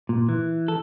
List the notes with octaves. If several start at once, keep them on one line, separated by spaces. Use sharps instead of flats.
A#2
E3
A4